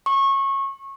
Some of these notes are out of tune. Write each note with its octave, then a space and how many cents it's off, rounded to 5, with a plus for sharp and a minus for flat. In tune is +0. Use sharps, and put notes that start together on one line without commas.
C#6 -25